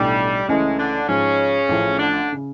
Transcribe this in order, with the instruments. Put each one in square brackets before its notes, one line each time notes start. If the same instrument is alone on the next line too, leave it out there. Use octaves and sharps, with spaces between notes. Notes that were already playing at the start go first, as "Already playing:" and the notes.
Already playing: [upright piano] B1 A2 E3 A3 D4 [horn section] G3
[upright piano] C#2 C#3 E3 A3 C#4 [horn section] G#2 G#3
[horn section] D3 D4
[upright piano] G#2 F3 G#3 [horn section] C#3 C#4
[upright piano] A1 A2 F3
[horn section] D3 D4
[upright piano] C#3